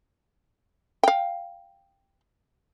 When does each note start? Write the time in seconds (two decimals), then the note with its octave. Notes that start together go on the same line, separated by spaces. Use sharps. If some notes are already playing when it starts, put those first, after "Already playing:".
1.03 F5 G5